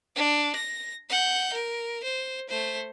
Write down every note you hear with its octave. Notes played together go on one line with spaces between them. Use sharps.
D4
A#6
F#5 G6
A#4
C5
A3 C5